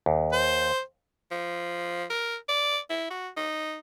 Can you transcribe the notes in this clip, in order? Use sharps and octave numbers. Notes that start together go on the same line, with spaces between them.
D#2
C5
F3
A#4
D5
E4
F#4
D#4